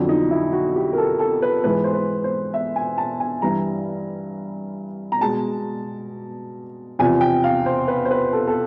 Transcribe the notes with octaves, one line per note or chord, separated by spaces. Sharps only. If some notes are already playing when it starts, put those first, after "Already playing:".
Already playing: F2 D3 F#3
D#4
E4
F#4
G4
A#4
A4
A4
B4
G#2 E3 G#3 B4
C5
B4
C5
E5
G#5
A5
G#5
G2 E3 G3 A#5
A#5
B2 G#3 A5
E2 C3 F3 G#5
G5
F5
C5
B4
C5
B4
A4
A4